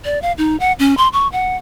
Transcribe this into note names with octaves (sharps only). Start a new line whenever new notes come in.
D5
F5
D#4
F#5
C#4
C6
C#6
F#5